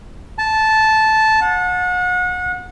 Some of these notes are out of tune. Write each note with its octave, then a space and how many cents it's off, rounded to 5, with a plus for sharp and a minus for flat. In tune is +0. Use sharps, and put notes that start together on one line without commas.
A5 -10
F#5 -35